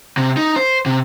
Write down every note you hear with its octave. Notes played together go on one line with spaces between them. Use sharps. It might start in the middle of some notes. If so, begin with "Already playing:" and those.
C3
D#4
C5
C3